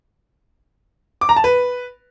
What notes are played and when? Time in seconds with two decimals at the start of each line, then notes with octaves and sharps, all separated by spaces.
1.21 D6
1.29 A#5
1.36 A5
1.44 B4